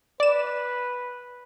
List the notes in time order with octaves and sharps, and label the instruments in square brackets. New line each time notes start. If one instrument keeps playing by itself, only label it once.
[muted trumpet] B4 [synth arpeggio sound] D5 E7